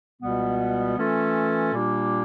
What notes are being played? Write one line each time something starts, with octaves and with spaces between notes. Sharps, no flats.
C#2 B2 G3 B3
E3 A3 C#4 F4 A4
A#2 G3 A#3 D4 G4